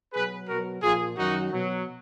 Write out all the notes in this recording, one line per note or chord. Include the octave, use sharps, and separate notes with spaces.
B2 F#3 G#4 B4
B2 F#3 F#4 A#4
A#2 F3 F4 G#4
F#2 D#3 F#3 D#4 F#4
B2 F#3